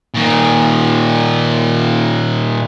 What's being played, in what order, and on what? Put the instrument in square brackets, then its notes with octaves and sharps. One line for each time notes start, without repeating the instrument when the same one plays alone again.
[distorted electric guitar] A#2 D#3